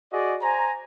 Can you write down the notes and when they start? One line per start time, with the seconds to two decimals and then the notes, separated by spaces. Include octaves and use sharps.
0.11 F#4 G#4 D5 D#5
0.40 C5 G#5 A#5